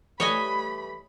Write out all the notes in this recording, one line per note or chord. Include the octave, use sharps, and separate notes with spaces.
E3 G3 A3 C#5 D#5 G#5 B5